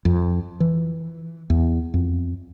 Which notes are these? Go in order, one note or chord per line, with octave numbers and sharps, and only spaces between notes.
F2
E3
E2
F2